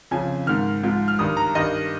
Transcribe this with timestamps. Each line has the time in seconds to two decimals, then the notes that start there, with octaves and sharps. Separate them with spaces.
0.11 F2 C#3 F3 G#5
0.47 G#2 D#3 F6
0.84 G#2 F3
1.08 F6
1.19 G2 D#3 D#6
1.37 A#5
1.55 G2 D#3 D#5